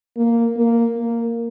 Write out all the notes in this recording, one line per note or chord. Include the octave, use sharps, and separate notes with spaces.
A#3
A#3
A#3